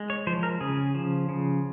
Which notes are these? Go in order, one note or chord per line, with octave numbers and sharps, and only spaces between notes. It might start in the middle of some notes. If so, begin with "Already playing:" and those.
Already playing: G#3
C#5
F3 C5
A#4
C#3 G#4
F3
C#3